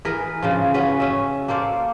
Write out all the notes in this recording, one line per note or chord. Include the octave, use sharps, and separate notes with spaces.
E3 G#4 A#4 B4
C#3 E3 F3
C#4 F#4 B4
C#4 E5
A#3 A4 C5 D5